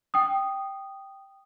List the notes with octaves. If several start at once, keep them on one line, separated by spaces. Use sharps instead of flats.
G5 D#6